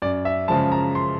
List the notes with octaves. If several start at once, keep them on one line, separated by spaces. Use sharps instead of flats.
F#2 D5
E5
C#3 F3 G#3 A5
A#5
C6